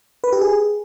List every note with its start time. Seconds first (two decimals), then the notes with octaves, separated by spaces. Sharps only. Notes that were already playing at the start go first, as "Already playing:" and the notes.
0.24 B4
0.33 G4
0.41 G#4